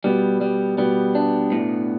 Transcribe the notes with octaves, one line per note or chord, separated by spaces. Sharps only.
B2 G3 B3
G3
B2 G3 B3
D4
A2